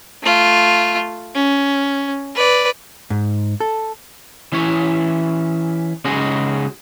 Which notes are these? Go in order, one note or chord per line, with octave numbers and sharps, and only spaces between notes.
A3 F4
C#4
B4 D5
G#2
A4
E3 C#4 E4 C#5
C#3 G#3 C#4 D#4 F#4 G#4